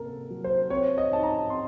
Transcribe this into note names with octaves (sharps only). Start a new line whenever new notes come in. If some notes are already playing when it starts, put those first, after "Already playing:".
Already playing: C3 A#3 A4 A#4
F#3
C5
C4 C#5
D#5
D#4 A5
A#5
C4 C6